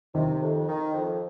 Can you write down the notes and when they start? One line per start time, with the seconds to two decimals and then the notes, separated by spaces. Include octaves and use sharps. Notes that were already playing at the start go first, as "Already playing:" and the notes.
0.15 C3 D#3
0.42 F2
0.68 D#3
0.94 F2